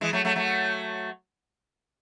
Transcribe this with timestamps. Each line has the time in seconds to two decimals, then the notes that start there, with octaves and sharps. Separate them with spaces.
0.01 E3 G#3
0.13 F#3 A3
0.25 F#3 A3
0.36 F#3 A3